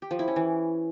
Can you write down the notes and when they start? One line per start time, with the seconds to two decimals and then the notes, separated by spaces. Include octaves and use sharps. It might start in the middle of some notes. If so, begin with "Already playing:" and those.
0.02 G4
0.11 F3
0.19 E4
0.28 C#4
0.36 E3